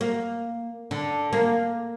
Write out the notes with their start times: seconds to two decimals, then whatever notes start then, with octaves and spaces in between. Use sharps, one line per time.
0.01 A#3
0.91 D3
1.33 A#3